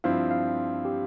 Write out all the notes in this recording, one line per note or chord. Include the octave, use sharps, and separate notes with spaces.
G2 F3 C4 E4 F5
F5
G4